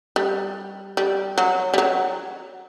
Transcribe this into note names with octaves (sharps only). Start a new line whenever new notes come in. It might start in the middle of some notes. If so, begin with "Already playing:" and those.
G3
G3
F#3
G3
F#3